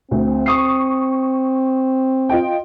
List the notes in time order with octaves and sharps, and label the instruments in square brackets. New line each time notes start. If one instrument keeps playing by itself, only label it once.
[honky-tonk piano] D2 [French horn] C4
[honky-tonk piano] C#6 D#6 C7
F4 D#5 G5